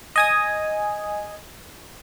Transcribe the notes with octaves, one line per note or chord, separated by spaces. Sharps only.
D#5 G#5 D#6